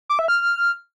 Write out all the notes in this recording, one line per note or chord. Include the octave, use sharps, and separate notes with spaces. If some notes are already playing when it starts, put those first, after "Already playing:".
D6
E5
F6